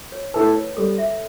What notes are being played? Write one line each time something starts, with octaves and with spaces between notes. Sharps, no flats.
C#5
A3 E4 A4 B4
C#5
G3 A4
E5